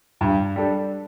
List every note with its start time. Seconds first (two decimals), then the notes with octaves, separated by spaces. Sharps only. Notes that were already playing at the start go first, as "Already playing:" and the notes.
0.21 G2
0.56 G3 D4 A4